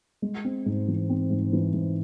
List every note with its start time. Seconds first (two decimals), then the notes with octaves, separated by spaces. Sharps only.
0.22 G#3
0.44 C4
0.66 G#2
0.88 E3
1.09 C4
1.30 G#2
1.53 E3
1.73 G#2